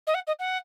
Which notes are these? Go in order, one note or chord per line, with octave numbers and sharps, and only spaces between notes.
D#5
F#5
D#5
F#5